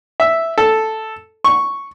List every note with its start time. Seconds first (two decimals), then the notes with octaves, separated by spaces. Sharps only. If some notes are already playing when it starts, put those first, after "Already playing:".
0.20 E5
0.58 A4
1.44 C#6